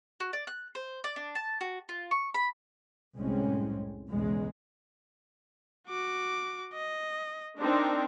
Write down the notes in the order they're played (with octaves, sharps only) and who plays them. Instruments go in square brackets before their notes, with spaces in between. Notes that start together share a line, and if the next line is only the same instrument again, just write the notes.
[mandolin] F#4
D5
F#6
C5
D5
D4
A5
F#4
F4
C#6
B5
[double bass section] C2 F#2 A2 G#3 C4 C#4
B1 E2 C#3 G#3
[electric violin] F#4 D6
D#5
[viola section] C4 D4 [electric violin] D#4 A#4